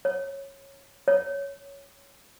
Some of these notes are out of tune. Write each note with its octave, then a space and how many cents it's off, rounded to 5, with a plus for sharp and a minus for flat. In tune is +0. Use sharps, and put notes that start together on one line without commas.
C#5 -10
C#5 +5